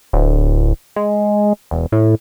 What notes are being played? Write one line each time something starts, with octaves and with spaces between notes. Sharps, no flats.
D1
G#3
E1
A2